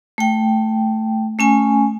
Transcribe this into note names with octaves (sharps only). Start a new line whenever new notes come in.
A3 G5
A3 C#4 G#5